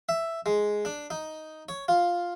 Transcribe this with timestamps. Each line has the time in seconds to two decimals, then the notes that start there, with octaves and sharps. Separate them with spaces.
0.09 E5
0.46 G#3
0.85 D4
1.10 D#4
1.69 C#5
1.88 F4